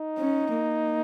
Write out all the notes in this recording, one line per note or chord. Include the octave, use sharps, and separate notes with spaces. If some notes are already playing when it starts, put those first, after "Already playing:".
Already playing: D#4
C#4
A#3